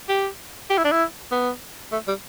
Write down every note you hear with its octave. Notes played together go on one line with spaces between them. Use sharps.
G4
G4
E4
D4
E4
B3
A3
G3